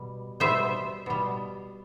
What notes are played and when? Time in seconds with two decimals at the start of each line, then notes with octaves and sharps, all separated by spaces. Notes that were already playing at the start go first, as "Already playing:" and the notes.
Already playing: B2 G3
0.40 B2 G3 C5 E5
1.06 B2 G3